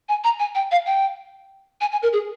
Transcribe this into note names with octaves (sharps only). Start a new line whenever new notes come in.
G#5
A#5
G#5
G5
F5
G5
G#5
G#5
A#4
G#4